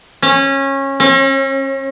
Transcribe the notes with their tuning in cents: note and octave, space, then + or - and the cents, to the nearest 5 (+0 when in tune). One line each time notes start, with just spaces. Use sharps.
C#4 -20
C#4 -40